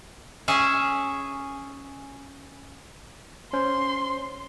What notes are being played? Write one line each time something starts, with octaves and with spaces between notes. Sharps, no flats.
C#4 G#4 E5
C#4 C5 C6